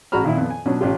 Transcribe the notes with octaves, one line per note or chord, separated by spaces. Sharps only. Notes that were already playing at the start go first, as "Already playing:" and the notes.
A1 G#3 F#4 A#5 B5 F6
A#2 D#3 E4
F2 B3
G#5
B2 F#3 C#4 D4
A1 C#4 F4 G4